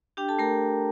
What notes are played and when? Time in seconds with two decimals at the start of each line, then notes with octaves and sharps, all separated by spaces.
0.17 D4 G4 G5
0.28 A4 A5
0.39 A3 A#4 A#5